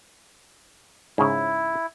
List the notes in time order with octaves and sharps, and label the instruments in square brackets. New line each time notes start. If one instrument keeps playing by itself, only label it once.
[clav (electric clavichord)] G#2 C#3 [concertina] E4